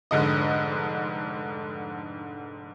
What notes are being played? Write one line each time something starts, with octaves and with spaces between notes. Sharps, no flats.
F1 G#2 D3 D#5